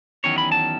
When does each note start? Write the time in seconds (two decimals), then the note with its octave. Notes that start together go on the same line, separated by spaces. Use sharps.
0.24 E2 D#3 F#3 C#4 C#5
0.38 B5
0.52 A5